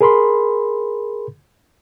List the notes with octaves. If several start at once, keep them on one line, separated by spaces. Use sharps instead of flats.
G#4 A#4 B5 C6